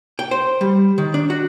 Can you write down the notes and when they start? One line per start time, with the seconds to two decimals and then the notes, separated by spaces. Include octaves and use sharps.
0.19 G5
0.31 C5
0.61 G3
0.98 D#3
1.14 D4
1.30 F#4